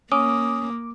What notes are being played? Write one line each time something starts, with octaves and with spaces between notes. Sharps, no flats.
A#3 C#4 D6 D#6